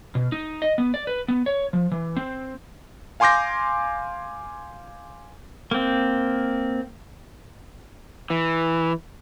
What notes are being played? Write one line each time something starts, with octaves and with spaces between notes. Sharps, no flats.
B2
D#4
D#5
B3
D5
B4
B3
C#5
F3
E3
C4
F5 G#5 C6 D6 G6 A#6
A#3 C4
E3